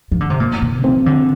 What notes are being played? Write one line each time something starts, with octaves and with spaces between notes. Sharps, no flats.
F3
D3
C3
A#2
A#2
F3 C4
D3